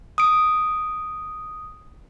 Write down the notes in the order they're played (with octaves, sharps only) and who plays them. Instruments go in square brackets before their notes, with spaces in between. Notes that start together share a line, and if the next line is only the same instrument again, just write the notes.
[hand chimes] D#6 D7